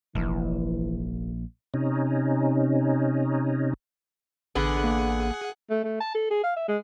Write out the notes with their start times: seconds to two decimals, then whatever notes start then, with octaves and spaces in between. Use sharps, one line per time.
0.15 F1 A#1 E3
1.74 C3 C#4 D#4
4.55 A1 D3 B3 G#4 F#5
4.84 A#3
5.70 A3
5.84 A3
6.00 A5
6.15 A4
6.31 G#4
6.44 F5
6.57 E5
6.68 G#3